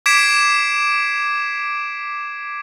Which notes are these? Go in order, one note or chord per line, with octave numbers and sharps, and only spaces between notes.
D6 G#6 B6 C7 D7 E7